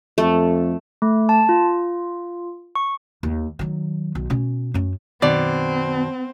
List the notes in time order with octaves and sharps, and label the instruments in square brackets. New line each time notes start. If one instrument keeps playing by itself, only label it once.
[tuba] F2 [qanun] A3
[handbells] A3
A5
F4
C#6
[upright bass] D#2
D#3 F#3
B1
B2 C#4
F#2 C#4
[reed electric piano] F#2 D#3 [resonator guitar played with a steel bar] B2 [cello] C4 [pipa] D5